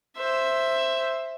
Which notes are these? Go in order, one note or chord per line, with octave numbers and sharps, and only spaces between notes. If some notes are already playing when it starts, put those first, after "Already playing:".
C5 E5